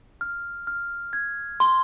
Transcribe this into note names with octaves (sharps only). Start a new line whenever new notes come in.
F6
F6
G#6
C6